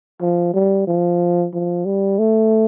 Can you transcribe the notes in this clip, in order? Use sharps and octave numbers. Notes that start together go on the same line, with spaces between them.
F3
G3
F3
F3
G3
A3